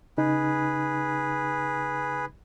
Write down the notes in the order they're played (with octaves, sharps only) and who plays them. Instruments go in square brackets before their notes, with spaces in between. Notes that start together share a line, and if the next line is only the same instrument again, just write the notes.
[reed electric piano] C#3 D#4 [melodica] G#4 B4